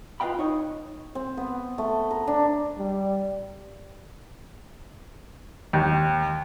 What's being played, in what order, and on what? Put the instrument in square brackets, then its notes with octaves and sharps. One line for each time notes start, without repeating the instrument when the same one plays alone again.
[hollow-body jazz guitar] F4 B4 D#5 F5 G5 B5
D#4 C#5 D#5
[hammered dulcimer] C4
B3
A3
A#4
D4
[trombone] G3
[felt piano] D#2